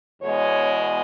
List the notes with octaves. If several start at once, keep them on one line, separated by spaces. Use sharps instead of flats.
E2 B2 G#3 C#5